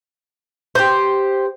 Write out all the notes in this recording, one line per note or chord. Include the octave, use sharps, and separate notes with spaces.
G4 C5